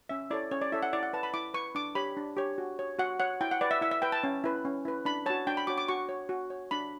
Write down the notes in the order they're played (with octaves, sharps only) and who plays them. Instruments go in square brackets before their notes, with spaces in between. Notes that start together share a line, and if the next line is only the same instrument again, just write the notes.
[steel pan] C#4 E5
E4 A4 C#5 D5
C#4 C#5
D5
E4 A4 C#5 E5
F#5
E4 D5
F#5
B4 A5
B5
E4 D6
B4 C#6
D4 D6
G4 C#5 B5
D4
G4 C#5
F#4
C#5
F#4 F#5
C#5 F#5
E4 G5
F#5
B4 D5
E5
E4 E5
E5
B4 G5
A5
C#4
E4 B4
C#4
E4 B4
D4 B5
F#4 C#5 A5
D4 G5
B5
F#4 C#5 D6
D6
F#4 C#6
C#5
F#4
C#5
D4 B5